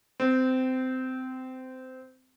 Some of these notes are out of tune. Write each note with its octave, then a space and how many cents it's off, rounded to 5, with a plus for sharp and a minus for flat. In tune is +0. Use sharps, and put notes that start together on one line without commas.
C4 -20